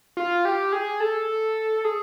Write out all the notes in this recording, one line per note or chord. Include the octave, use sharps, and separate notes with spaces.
F4
G4
G#4
A4
G#4